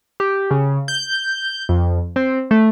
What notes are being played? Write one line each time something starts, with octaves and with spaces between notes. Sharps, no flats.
G4
C#3
G6
F2
C4
A3